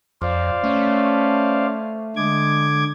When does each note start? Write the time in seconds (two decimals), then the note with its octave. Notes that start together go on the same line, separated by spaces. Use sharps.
0.22 F2 C5 D5 F5
0.64 A3 C#4
2.16 D3 G#3 D6 G#6